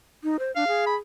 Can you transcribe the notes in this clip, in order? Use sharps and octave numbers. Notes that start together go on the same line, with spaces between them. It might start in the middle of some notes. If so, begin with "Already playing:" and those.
D#4
C5
D4 F5
G#4
B5